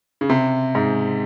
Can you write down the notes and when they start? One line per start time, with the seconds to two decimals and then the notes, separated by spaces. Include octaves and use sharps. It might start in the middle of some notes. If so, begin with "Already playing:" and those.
0.21 C#3
0.29 C3
0.75 G#2